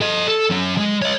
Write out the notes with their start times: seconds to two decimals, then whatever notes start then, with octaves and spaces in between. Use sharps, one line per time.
0.01 A4 D#5
0.28 A4
0.51 F#3 C#4
0.78 G#3
1.02 C#5 D#5